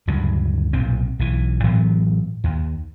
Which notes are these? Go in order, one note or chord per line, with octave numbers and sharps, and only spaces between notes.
D2 G2 C#3 F#3
B1 A#2 C4
B1 E3
A2 E3 F#3 B3
D#2